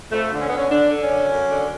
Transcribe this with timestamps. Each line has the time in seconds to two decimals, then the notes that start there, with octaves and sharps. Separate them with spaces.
0.11 F2 A3
0.32 D3
0.41 C#4
0.49 D3 B3
0.58 C#4
0.71 D3 D4
0.91 D3
1.02 C#4
1.11 F#2
1.31 F#2
1.51 D3